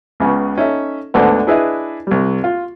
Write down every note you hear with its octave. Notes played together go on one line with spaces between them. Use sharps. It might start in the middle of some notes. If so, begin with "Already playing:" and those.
C#2 C#3 B3
C#4 D#4 A4 E5
D2 G#2 D3 A3 B3
D4 E4 G#4 B4 D#5 E5
C2 G3
F4